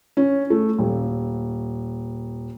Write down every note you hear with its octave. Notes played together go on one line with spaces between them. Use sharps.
C#4
A3
D#1